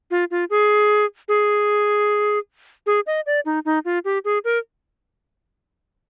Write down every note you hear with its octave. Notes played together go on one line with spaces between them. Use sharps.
F4
F4
G#4
G#4
G#4
D#5
D5
D#4
D#4
F4
G4
G#4
A#4